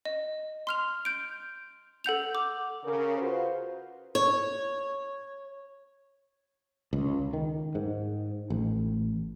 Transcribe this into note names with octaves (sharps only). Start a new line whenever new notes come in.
D#5
C6 F6 F7
G6 D7
A4 F#5 G6 F7
D6
C#3 A#4
F4 F#4 B4 C5
C#5
C#2
D#3
G#2
A1